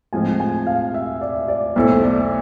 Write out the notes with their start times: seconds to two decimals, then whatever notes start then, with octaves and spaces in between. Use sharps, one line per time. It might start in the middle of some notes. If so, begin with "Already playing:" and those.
0.13 A2 F3 G#3 C4 F4 G#5
0.40 G#5
0.67 F5
0.94 E5
1.21 D5
1.48 D5
1.76 B1 B2 A3 E4 A4 C5
2.03 D5